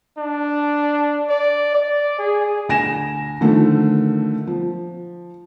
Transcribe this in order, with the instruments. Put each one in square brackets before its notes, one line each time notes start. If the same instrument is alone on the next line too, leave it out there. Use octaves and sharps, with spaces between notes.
[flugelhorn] D4
D5
D5
G#4
[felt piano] D2 G#5 A#6 E7
D3 D#3 F3 A3
F3